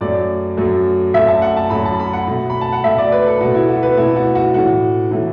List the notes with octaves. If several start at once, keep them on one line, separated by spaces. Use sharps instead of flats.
F#2 F#3 A3 D5
F#2 F#3 A3
F#2 F#3 A3 E5
A5
F#5
A5
F#2 F#3 A3 B5
A5
B5
F#5
B2 A3
B5
A5
F#5
B2 A3 E5
D5
B4
A4
B2 A3 F#4
E4
F#4
B4
B2 A3 E4
F#4
F#4
A2 E3 A3 F#4
A2 E3 A3